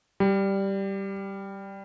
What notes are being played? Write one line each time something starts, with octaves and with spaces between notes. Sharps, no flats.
G3